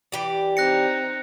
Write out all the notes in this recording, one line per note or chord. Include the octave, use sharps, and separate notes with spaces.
E3 G4 D5
C4 D#4 F#6 A#6 C#7